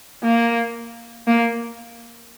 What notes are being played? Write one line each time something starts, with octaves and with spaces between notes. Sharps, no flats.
A#3
A#3